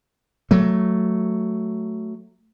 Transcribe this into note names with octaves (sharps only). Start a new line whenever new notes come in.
F#3 A3